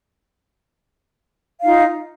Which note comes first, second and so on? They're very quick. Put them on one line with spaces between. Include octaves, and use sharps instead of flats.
F5 D#4 F4